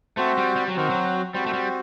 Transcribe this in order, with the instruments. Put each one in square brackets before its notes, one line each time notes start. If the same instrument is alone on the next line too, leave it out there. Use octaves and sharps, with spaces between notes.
[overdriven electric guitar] A3 [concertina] C4 F#4 C5
[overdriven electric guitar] G3
G3
F#3
[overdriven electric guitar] D#3 [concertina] C4 F#4 C5
[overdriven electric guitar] F#3
[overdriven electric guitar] G3 [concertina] C4 F#4 C5
[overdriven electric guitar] A3
G3